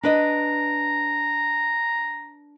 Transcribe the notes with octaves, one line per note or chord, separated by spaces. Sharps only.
D4 B4 D#5 A#5